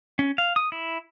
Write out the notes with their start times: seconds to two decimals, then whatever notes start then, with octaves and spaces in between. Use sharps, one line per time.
0.19 C#4
0.38 F5
0.56 D#6
0.72 E4